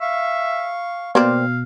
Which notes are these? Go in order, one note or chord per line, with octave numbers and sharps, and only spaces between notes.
E5 F5 C#6
B2 A#3 C4 D5 F5